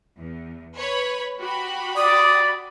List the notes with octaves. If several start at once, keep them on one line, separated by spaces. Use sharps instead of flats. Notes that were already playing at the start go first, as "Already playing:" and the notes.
E2
B4 C#5 B5
F#4 G4 B5
D5 D#6